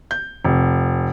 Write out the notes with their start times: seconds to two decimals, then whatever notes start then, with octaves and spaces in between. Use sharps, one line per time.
0.11 G6
0.44 F1